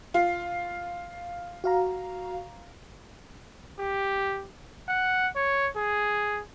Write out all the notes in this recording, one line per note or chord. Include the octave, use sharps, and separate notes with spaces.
F4
F#4 F5 A#5
G4
F#5
C#5
G#4